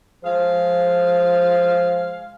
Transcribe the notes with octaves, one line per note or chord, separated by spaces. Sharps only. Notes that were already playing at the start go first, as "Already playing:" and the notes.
F3 G#3 G#4 C5 F5